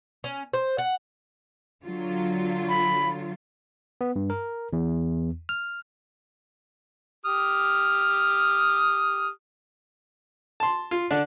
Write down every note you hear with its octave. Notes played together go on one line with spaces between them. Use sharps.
C#4
C5
F#5
D3 F#3 F4
B5
B3
G2
A#4
E2
F6
G4 D#6 F6
A5 C6
F4
D3 D4